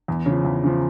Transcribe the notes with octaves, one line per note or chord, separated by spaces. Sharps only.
E2
C#3 F3
E2
C#3 F3